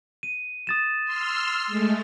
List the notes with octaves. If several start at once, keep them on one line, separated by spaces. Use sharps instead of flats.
D#7
D#6 A6 E7
C6 E6 F6
G#3 A3